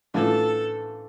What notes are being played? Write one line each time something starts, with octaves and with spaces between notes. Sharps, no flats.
A2 E3 A3 D4 F4 A4